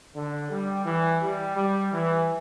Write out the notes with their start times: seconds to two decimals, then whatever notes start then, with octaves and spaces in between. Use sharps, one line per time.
0.15 D3
0.50 G3
0.85 E3
1.21 G3
1.56 G3
1.92 E3